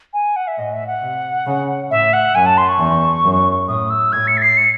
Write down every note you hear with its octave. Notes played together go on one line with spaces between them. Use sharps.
G#5
F#5
E5
A2 D#5
E5
F#5
C3
C#3
A2 E5
F#5
F#2 G#5
A5
C6
C#6
E2
F#2
A2 D#6
E6
A2 G#6
C#7
A6
C7
C#7